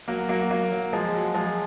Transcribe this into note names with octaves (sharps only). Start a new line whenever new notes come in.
F#3 A#3
F#3 A#3
F#3 A#3
F#3
F3 G#3
F#3
F3 G#3